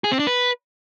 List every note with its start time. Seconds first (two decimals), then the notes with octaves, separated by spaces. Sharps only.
0.04 G#4
0.12 C4
0.19 D4
0.27 B4